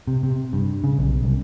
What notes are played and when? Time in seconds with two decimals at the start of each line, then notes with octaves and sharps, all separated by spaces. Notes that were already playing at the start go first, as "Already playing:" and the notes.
0.07 C3
0.23 C3
0.53 G2
0.84 C#3
0.99 B1
1.24 C2